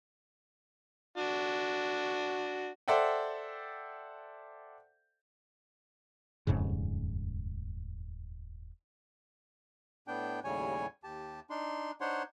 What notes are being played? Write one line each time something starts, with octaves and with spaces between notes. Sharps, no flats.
D4 F#4
A4 C5 D5 E5 F#5 G5
D#1 F2 G#2 C#3
A2 B3 D4 G5
D#2 A2 C#3 G3 C#5 G#5
D#2 G4 A5
D4 D#4 C6
D4 D#4 C5 C#5 F#5 C6